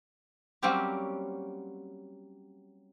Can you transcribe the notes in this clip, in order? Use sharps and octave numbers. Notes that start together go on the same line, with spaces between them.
F#3 G3 A#3 C4 C#4 G4